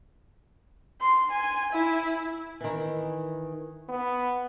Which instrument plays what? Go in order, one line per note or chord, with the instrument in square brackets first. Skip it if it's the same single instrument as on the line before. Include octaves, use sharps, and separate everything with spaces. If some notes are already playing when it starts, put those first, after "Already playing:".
[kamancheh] C6
G#5
E4
[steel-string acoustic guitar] D#3 E3
[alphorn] B3